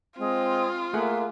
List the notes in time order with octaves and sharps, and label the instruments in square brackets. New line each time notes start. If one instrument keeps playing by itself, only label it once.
[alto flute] G#3 [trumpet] C4 [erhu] F4
[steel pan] A3 G#4 F#5 [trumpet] A#3 [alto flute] E5